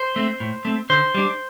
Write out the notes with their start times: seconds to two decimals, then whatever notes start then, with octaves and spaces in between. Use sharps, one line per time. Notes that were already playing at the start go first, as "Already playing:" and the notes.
Already playing: C5
0.16 A3 C4
0.40 A2
0.65 A3 C4
0.90 D3 C5
1.14 G3 D4